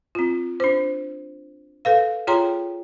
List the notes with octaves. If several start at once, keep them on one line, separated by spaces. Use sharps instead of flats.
C4 F4
D4 C5
A4 B4 F5
F4 G#4 C#5 G5 A#5 C6